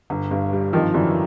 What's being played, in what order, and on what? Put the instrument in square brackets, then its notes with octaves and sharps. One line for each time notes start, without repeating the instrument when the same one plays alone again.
[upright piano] G1
G2
G3
[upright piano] G#1 [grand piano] D#3 F3
[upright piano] F#2 [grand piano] D3 E3